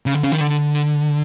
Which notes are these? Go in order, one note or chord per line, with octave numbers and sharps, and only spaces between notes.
C#3
D3
C#3
D#3
D3